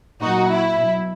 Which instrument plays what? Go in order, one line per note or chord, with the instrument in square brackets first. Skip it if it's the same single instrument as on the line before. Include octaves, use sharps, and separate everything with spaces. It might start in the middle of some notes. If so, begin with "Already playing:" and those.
[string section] A#2 F#3 D#4 F#4
E4
B2 F#3